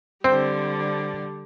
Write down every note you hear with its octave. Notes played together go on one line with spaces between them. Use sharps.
D3 G3 C4 C5